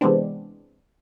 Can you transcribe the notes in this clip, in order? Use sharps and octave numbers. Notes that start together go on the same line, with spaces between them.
C3 E3 G#3 B3 C4 D4